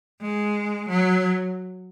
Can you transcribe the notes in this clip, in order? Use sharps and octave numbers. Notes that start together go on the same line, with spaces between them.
G#3
F#3